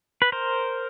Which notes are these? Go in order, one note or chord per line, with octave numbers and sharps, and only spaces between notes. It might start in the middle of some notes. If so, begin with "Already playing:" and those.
B4
A#4 C5